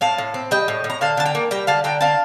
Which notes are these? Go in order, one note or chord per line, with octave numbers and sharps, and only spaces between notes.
A2 F5 A5
A2
C4
G3 D#5 G5
A2
A2
A#5
D3 F5 A5
D3 A5
G5 A#5
A#3
G3 G5 A#5
D3 F5 A5
D3 G5 A#5
D3 F5 A5